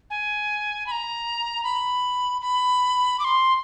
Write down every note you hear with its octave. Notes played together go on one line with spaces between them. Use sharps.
G#5
B5
A#5
B5
B5
D6
C6